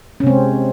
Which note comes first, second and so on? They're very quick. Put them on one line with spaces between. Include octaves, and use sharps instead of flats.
C#4 C3 C4 G#3